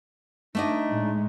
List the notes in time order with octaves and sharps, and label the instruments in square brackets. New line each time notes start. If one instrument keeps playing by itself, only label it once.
[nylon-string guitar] A3 D4 D#5 [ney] D#4
[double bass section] A2 G#3